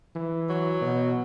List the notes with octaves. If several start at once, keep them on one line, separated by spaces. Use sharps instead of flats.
E3
F#3
B2